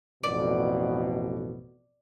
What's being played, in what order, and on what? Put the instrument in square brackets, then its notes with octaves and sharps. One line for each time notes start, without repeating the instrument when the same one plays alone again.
[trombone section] A1 F2 B2 [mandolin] D5